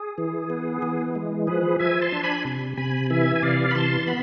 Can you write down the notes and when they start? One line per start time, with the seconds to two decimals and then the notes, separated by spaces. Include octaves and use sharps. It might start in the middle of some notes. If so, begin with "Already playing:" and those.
Already playing: G#4
0.18 E3
0.50 B3
0.82 E3
1.15 G#3
1.47 F3 G#4 B4
1.79 F3 E5 G#5
2.01 A5 C6
2.12 D4
2.24 G#5 B5
2.45 C3
2.77 C3 G#5 B5
3.10 E3 E5 G#5
3.36 G#5
3.42 C3 D5 F5
3.71 B5
3.75 E3 A5 C6
4.07 B3 B5